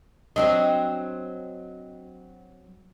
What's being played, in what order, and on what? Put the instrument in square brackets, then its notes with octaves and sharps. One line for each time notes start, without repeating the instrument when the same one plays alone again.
[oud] F#3 C4 D4 [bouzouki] D#5